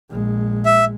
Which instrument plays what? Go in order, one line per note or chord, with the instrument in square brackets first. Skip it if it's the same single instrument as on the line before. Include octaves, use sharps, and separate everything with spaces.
[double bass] A#1 G#3
[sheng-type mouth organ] E5